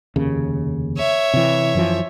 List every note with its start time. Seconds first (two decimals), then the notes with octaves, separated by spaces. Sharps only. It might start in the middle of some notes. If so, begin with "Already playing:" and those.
0.16 F1 D#2 C#3
0.97 C#5 E5
1.34 C3 E3
1.75 F#2 E3 F3